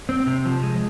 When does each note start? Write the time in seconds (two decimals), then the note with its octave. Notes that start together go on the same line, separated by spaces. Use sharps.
0.09 C4
0.27 C3
0.46 F3
0.63 G#3